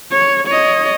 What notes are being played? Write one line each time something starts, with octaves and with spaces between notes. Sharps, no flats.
C#5
C#5 D#5